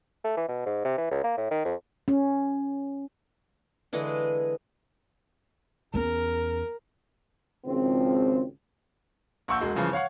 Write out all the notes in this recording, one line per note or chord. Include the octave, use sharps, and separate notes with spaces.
A3
E3
B2
G#2
C3
E3
C#2
A#3
A2
D#3
F2
C#4
D3 E3 G#3 G#4
E2 C#4 A#4
G#1 C#2 F3 C4
A#1 F#5 C#6 E6 G6
E1 G#3 F#4
G2 C#3 E3 F3
C#5 F5 F#5 C#6